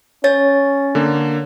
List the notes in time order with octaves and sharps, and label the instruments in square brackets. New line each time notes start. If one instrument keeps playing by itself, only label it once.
[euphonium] C#4 [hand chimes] C#5 A6
[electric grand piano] D3 A#3